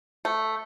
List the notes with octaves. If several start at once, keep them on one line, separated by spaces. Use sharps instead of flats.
A3